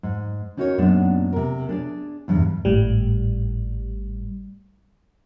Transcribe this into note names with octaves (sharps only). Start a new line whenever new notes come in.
G#2
C#4 D#4 F#4 A#4 C5 C#5
F#2 A#2 G#3 B3 D4
C3 A#4
D4 G#4 D5
E2 G2 C3
G#1 A2 G3